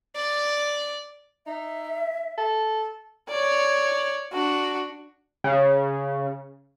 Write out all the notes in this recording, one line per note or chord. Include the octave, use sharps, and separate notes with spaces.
D5
D#4 E5
A4
C#5 D5
D4 F#4
C#3